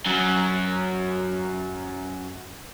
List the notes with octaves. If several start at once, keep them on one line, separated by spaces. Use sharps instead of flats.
F#2 F#3